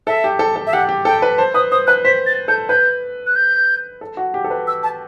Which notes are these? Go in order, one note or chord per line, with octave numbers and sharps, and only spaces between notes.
A4 E5
G4
A4
A4
E5
G4 F#5
G4
A4 G5
B4
C5 A5
B4 D#6
C5 D#6
B4 F#6
C5 B6
A6
A4 G6
B4 G6
F#6
G6
A4
F#4
G4
A4
B4
E6
A5